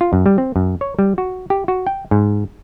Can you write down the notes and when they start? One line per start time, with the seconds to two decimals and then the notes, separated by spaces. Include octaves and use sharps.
0.01 F4
0.13 F#2
0.26 G3
0.38 C4
0.56 F#2
0.81 C#5
0.99 G3
1.18 F#4
1.50 G4
1.68 F#4
1.87 G5
2.11 G#2